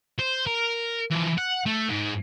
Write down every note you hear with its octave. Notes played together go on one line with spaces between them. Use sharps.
C5
A#4
E3 F3
F#5
A3
G#2